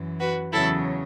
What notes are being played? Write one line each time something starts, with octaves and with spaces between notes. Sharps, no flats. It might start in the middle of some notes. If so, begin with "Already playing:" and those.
Already playing: F#2 E3
F#4 B4
E2 C#3 F#3 E4 A4